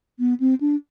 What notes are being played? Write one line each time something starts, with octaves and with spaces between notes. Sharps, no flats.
B3
C4
D4